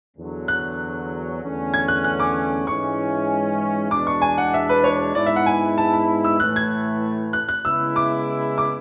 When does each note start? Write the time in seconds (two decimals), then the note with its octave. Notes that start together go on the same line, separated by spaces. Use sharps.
0.17 E2 D3 F#3
0.48 F#6
1.43 E2 D3 A3 C#4
1.74 G#6
1.88 F#6
2.04 F#6
2.20 D6
2.66 G#2 E3 G#3 C#4 E4 C#6
3.91 E2 B2 G#3 D4 D6
4.07 C#6
4.22 G#5
4.38 F#5
4.54 E5
4.69 B4
4.84 C#5
5.15 G#2 G#3 B3 E4 D5
5.26 E5
5.36 F#5
5.46 G#5
5.78 A5
5.94 B5
6.24 E6
6.40 A2 E3 A3 F#6
6.56 G#6
7.33 F#6
7.49 F#6
7.64 C#3 G#3 B3 E4 E6
7.96 D6
8.58 D6